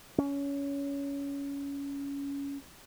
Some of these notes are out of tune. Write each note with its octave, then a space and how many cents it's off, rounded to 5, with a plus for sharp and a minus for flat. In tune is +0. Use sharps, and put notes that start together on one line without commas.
C#4 +20